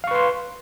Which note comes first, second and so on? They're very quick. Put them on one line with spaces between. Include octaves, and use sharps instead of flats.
F5 C#6 B4 C6